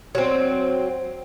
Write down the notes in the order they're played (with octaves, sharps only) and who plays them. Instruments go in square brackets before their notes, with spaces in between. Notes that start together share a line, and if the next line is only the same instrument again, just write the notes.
[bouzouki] F#3 C4